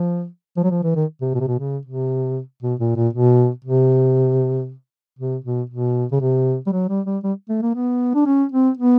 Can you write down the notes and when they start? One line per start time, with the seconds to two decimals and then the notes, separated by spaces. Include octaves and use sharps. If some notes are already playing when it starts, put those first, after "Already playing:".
Already playing: F3
0.57 F3
0.63 F#3
0.70 F3
0.83 E3
0.96 D#3
1.21 C3
1.34 B2
1.40 C3
1.47 B2
1.60 C#3
1.85 C3
2.62 B2
2.79 A#2
2.96 A#2
3.13 B2
3.65 C3
5.19 C3
5.44 B2
5.69 B2
6.12 C#3
6.21 C3
6.66 G3
6.72 F#3
6.89 G3
7.06 G3
7.23 G3
7.49 A3
7.62 A#3
7.75 B3
8.14 D4
8.26 C#4
8.52 C4
8.77 B3